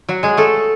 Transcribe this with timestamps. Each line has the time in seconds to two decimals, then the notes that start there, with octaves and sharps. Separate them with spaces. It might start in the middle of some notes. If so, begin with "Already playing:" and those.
0.08 F#3 F#4
0.23 G#3 G#4
0.37 A3 A4